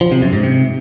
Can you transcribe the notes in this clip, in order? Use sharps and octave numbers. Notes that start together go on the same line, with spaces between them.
F3
C3
F#2
G#2
C3